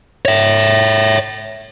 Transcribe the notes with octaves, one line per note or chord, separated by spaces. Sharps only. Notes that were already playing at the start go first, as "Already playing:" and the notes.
C#5 E5